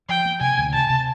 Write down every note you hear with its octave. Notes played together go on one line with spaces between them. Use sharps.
F3 G5
A#3
C3 G#5
D2
C3 A5
C3